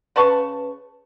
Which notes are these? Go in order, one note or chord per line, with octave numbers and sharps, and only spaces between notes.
C#3 B4 A5 C#6